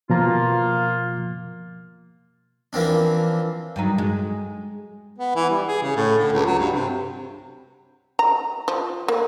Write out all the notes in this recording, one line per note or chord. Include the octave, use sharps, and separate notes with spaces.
B2 F3 A#3 F4 A#5
E3 F3 A#3 C4 D4
G2 F#3 D#4
G#3
B3
E3
G3
G#4
C#3
A2
D3
C#2
F#3
G2
C3
A#5
F3
A#3